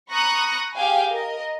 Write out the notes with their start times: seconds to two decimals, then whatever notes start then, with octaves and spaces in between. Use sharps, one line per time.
0.11 A#5 B5 C#6 D#6 F#6 A#6
0.75 G4 G#4 F5 G5 G#5
1.10 A#4 D#5